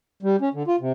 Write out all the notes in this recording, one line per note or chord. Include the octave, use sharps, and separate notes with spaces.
G3
C#4
D3
F4
C3